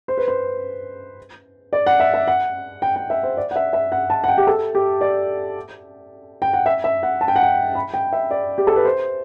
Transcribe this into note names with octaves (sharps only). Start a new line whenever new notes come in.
C5
B4
C5
D5
F#5
E5
E5
F#5
G5
G5
E5
C5
D5
F#5
E5
E5
F#5
A5
F#5
G5
G4
A4
G4
D5
G5
F#5
E5
E5
F#5
A5
G5
F#5
G5
B5
G5
E5
D5
G4
A4
B4
C5